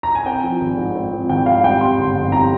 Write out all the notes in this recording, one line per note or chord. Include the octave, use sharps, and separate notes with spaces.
A#5
G#5
C4 G5
F3
G#1
G#2
C4
F3
G#1 G5
G#2 F5
G3 G5
C3 C6
G1
F2
G3 A#5